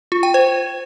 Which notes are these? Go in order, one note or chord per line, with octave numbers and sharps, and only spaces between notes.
F4
G5
C5